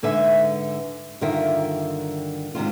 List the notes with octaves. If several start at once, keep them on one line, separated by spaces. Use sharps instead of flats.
G#2 D3 B4 E5 G#5
G2 D3 D#3 F4 A#4 E5
G#2 C3 D#3 F4